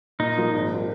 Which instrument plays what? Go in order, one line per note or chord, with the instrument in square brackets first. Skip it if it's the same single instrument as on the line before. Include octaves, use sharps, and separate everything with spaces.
[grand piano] A#2 [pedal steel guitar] D#4
[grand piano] F3 A#3 F4
G#1
G3 A#3 F4